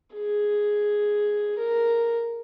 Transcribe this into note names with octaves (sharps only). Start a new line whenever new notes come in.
G#4
A#4